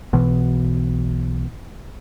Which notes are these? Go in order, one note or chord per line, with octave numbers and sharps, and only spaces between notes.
B1 B2 E3 B3